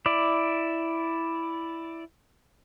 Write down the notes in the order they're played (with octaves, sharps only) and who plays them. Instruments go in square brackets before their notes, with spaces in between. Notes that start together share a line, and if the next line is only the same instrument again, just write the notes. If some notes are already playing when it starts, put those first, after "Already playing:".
[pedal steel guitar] E4 D5